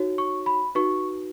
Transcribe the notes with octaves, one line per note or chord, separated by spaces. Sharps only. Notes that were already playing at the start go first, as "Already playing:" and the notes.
Already playing: D#4 F#4 C#5
C#6
B5
D#4 F#4 B4 C#6